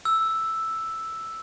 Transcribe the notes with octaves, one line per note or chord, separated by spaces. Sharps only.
E6